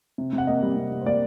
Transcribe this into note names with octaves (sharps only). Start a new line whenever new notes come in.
C3
C3
F#5
A#3 D#5
G3
C3
C3
C5
A#3 D5